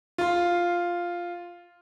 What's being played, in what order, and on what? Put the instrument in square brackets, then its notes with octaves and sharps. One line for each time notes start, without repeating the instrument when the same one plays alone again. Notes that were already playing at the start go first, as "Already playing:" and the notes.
[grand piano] F4 C6